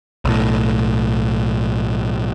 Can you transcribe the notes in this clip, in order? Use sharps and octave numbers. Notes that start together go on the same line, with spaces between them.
B1 A2